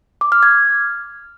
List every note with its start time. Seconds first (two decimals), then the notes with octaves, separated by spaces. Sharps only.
0.21 D6
0.32 F6
0.43 G#6